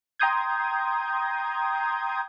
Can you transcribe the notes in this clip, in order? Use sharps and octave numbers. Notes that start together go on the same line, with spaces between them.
G5 A#5 C6 D#6 G6 G#6